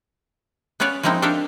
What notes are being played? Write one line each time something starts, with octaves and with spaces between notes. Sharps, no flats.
B3 C#4 B4 C#5 D5 F5
F3 G#3 A#3 C4 D#4 E4
D4 A4 A#4 E5 F5 G5